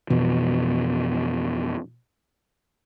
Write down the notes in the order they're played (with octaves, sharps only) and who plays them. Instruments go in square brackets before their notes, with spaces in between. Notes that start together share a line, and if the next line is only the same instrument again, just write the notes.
[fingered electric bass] F2 B2 E3